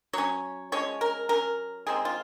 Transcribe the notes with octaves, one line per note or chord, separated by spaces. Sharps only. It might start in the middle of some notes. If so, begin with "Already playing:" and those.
F#3 C#4 C#5
F3 G#3 C#4 C#5
A#4
F#3 C#4 A#4
D#3 G#3 C4 G#4
F4